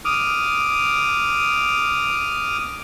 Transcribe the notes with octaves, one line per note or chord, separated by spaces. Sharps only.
D6 D#6 F6